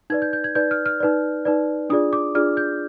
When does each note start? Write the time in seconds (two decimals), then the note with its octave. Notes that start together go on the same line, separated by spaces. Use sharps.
0.10 D#4 B4 D5 G#6
0.22 G6
0.33 G6
0.44 G#6
0.55 D#4 B4 D5 G6
0.71 F6
0.86 F6
1.00 D#4 B4 D5
1.45 D#4 B4 D5
1.90 D4 F4 G#4 D5 D#6
2.13 D6
2.35 D4 F4 G#4 D5 F6
2.57 G6